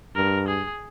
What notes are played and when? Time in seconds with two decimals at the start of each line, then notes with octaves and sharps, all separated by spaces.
0.16 G2 A#4
0.48 G#4